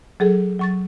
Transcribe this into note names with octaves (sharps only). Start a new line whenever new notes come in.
F#3 G#4 A4
F#3 C#6 A6